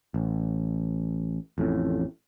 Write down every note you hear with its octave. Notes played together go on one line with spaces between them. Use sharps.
A1
A1 F2 A2